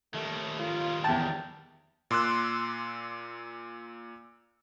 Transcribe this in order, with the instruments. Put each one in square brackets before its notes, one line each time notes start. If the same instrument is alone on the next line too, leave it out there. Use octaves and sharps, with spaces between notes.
[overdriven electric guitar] D#3 G3 [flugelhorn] A3
[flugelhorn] F4
[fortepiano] E2 A5 [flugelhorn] G5
[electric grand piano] A#2 C6 D6 E6 F#6